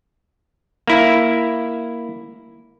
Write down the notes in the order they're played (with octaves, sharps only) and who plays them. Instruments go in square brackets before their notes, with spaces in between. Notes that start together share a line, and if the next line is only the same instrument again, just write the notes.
[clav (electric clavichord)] A#3 E4